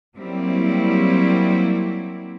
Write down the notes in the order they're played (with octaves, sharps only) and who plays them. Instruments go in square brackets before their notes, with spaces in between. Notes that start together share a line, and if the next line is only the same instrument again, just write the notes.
[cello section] F#3 G3 A#3 C4 E4